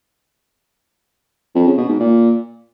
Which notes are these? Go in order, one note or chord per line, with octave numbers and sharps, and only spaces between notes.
F2
C#3
B2
G#2
A#2